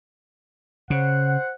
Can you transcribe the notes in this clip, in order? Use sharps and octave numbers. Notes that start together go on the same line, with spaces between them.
C#3 C5 F#5